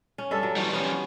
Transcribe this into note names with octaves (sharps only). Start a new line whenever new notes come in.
C#4
G2 A4 E5
F#3
E3 G3 F#4
B3 C#4